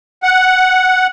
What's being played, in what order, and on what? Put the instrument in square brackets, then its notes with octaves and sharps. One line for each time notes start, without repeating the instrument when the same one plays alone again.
[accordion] F#5